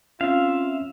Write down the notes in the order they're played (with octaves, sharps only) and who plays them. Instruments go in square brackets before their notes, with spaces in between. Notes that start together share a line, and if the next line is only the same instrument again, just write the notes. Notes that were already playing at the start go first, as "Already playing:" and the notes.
[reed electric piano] C4 C#4 [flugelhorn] F4 [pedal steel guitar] E5 F5